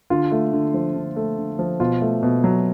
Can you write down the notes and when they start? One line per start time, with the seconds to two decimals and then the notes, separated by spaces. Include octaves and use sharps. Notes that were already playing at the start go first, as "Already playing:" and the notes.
0.10 D3 F4
0.32 A3
0.53 D3
0.74 F3
0.96 D3
1.16 A3
1.38 D3
1.59 F3
1.80 B2 F4
2.01 A3
2.23 B2
2.44 F#3